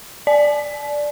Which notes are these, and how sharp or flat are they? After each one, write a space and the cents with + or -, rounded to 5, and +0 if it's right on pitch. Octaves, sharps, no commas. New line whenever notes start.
D5 +0 A5 -45